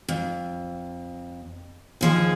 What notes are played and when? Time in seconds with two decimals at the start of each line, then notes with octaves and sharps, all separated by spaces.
0.09 F2
2.01 D#2 F3 G#4